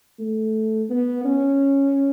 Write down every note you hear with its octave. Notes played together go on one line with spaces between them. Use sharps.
A3
B3
C#4